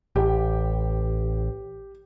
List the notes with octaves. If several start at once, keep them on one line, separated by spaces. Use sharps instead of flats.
A1 G4